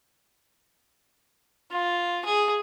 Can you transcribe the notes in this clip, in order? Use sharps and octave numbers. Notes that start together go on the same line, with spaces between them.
F4
G#4